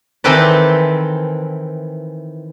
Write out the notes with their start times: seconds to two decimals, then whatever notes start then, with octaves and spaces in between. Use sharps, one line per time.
0.24 D#3 E3 C4 A4 B4 D5